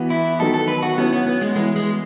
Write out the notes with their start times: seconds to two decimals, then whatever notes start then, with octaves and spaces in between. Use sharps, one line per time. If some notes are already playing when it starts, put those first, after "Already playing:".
Already playing: E3 B3 F#4
0.10 E4
0.39 D#3 F#3 B3 D#4 A4
0.54 A4
0.68 B4
0.83 F#4
0.98 F#3 B3 C#4 E4
1.13 B3
1.27 B3
1.41 G#3
1.55 E3 G#3 B3 E4
1.76 G#3